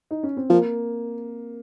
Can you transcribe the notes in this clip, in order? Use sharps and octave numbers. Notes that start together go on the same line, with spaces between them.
D#4
C#4
C4
F3 A#3